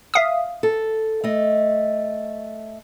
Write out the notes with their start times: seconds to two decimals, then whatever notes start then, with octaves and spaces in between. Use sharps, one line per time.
0.14 E5 F5 D#6
0.63 A4
1.24 A3 D#5